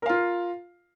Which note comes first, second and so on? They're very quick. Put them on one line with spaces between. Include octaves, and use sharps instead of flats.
A#4 F5 F4